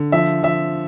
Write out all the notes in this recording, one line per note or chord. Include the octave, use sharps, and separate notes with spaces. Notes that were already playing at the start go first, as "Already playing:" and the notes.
Already playing: D3
F3 E5
F3 E5